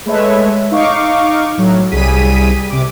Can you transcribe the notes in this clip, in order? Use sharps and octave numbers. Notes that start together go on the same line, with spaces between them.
G#3 A3 B4 C#5 E5
D#4 F5 C#6 D6
A2 F#3
C2 G3 G#4 B6 D#7
C3 D6